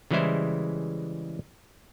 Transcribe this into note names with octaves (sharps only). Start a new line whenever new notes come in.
C#3 E3 G3 G#3 E4 C5